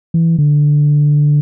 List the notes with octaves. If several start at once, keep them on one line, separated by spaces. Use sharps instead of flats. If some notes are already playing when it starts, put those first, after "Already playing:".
E3
D3